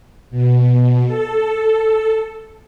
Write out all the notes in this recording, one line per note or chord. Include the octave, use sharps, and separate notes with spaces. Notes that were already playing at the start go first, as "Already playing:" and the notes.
B2
A4